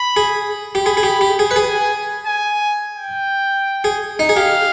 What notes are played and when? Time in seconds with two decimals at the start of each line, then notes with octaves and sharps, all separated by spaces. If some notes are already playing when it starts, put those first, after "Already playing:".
Already playing: B5
0.16 G#4
0.75 G4
0.86 G#4 B5
0.97 G#4
1.03 G4
1.21 G4
1.39 G#4
1.51 B4
1.56 G#4 G#5
2.26 G#5
2.96 G5
3.84 G#4
4.19 D#4
4.29 G#4
4.36 G4 F5